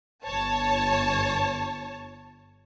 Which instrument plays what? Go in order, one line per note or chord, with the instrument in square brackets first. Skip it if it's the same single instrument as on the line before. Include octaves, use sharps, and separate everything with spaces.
[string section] G1 C#5 A5